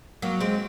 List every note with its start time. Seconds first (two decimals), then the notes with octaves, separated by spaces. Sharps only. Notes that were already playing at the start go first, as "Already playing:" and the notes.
0.22 F#3 A#3
0.40 G#3 C4